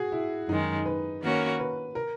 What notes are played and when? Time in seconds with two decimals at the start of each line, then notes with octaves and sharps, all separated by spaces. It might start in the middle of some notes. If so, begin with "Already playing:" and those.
Already playing: F#4 G#4
0.12 E4
0.49 F#2 D#3 G#3 D#4
0.86 B4
1.22 D#3 A#3 C#4 F#4 A#4
1.59 B4
1.95 A#4